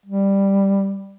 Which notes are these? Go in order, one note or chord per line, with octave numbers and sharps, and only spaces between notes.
G3